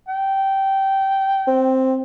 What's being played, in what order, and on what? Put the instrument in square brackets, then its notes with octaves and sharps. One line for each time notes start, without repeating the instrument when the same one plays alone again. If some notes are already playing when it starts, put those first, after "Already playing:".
[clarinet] G5
[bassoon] C4